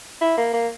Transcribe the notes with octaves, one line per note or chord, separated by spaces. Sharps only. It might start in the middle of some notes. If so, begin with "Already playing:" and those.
E4
A#3
A#3